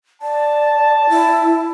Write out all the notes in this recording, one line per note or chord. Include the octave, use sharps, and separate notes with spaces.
D5 A5
E4